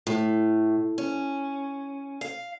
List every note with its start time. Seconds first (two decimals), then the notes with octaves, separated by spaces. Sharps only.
0.07 A2
0.98 C#4
2.21 F5